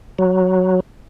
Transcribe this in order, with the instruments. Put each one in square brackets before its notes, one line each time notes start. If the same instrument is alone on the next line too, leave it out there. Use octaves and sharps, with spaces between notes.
[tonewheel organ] F#3